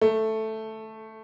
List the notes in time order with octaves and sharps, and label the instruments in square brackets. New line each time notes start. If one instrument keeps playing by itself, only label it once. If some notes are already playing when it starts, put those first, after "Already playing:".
[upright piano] A3